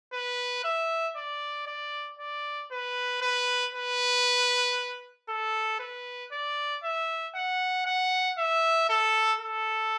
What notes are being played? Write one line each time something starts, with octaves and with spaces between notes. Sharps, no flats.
B4
E5
D5
D5
D5
B4
B4
B4
A4
B4
D5
E5
F#5
F#5
E5
A4
A4